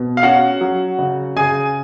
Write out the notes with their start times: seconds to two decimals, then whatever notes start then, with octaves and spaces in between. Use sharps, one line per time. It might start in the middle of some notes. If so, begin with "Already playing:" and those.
Already playing: B2
0.17 F5
0.23 C#4 F#4 F#5
0.61 F#3
0.99 C#3
1.36 C#3 G#4 G#5